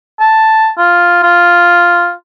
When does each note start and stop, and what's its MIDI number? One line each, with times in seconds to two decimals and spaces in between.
0.20 0.71 81
0.78 1.21 65
1.23 2.12 65